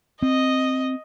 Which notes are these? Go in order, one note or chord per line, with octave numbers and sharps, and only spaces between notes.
C4 D#5